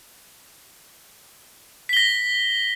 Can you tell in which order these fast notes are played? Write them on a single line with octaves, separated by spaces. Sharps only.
B6 G7 A#6